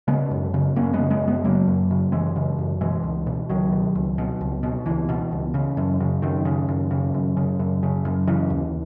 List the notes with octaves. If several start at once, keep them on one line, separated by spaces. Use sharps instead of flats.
C#3 G#3 B3
F#2
C#3
F#2 A#3 C#4
G#3 B3
C#3
G#3 B3
F#2
G#3 B3
C#3 F#3 A#3
F#2
C#3
F#2 E3 G#3
C#3
F#2
B2 E3 G#3
C#2
B2
C#2 D#3 F#3
B2
C#2
B2
C#2
B2
C#2 E3
B2
C#2
C#3
F#2
C#3
F#2 D#3
C#3
F#2
C#3
F#2
C#3
F#2
C#3
F#2
C#3 E3
D#2